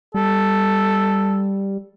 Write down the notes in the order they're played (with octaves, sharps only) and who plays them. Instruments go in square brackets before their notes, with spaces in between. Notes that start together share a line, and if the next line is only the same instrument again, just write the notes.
[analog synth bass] G3 [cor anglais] A4